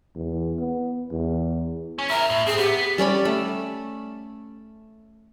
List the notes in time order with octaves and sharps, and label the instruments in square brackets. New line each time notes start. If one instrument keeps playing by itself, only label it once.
[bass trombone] E2
B3
E2
[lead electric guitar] C#4
[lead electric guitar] E4 A#4 [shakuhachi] E5
[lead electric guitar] A2
[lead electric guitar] C4 [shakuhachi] G#4
[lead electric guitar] B3 [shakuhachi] G4
[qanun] G3 C#4 D5 B5
A3